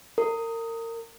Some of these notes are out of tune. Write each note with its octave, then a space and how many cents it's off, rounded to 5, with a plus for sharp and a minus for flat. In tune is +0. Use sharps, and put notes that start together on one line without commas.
A#4 -30